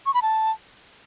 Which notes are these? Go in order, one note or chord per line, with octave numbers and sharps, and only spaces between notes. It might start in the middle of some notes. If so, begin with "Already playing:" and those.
C#6
B5
A5